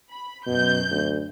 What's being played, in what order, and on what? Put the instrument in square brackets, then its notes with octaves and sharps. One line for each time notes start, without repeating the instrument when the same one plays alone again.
[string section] B5
[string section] F#2 G6 [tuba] B2
[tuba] D2